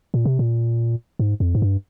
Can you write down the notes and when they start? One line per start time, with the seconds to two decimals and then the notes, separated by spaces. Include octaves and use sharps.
0.14 A#2
0.25 C3
0.39 A#2
1.19 G#2
1.40 F2
1.55 G#2
1.62 G2